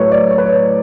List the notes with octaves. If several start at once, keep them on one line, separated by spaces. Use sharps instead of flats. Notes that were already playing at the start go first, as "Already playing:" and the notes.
Already playing: A2 F#3 A3 B4 C#5
D5
C#5
B4
C#5